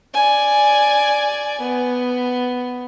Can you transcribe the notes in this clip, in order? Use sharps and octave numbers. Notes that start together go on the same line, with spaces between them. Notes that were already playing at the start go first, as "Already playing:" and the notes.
D5 G#5
B3